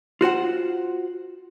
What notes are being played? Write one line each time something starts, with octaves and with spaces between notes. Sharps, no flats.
F4 F#4 C5 F#5